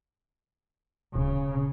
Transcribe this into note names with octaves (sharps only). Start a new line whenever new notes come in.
D1 C#3